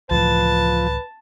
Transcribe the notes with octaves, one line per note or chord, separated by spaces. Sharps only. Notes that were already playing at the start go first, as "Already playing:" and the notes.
C#2 A2 E3 F3 B4 A5